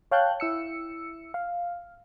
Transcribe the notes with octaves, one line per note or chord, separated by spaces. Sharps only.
C#5 F5 G5 A5 F#6 G6
E4 E6 C#7
F5